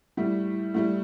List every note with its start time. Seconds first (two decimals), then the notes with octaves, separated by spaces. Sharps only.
0.17 A2 G3 E4
0.74 A2 G3 E4